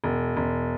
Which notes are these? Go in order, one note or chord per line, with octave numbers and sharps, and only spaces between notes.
E1
E1